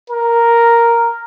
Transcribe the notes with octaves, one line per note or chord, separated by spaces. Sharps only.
A#4